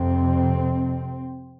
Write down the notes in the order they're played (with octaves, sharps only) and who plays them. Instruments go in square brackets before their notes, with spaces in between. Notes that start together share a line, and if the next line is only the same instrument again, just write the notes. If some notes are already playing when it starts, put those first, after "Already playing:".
Already playing: [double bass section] F2 C3 C4